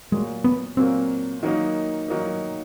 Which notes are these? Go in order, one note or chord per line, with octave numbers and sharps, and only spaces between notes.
A#2 F#3 G#3 A#3
B3
A#2 F#3 A#3 C4
D#3 F#3 A#3 D#4
D#3 F#3 A#3 D#4